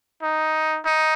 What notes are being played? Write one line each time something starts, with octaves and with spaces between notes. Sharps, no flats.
D#4
D#4